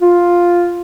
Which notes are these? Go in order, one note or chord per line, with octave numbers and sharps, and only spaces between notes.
F4